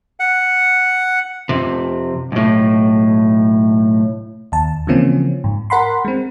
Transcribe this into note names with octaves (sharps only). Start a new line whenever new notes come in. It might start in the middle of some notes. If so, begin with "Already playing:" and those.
F#5
F2 C3
B1 A2
D#2 A5
C#3 E3 F3 A#3 C4 C#4
G#2
A#4 F#5 B5 C6
G#3 C4